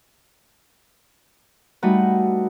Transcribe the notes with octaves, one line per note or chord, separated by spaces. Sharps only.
G3 A3 D#4 F#4 B4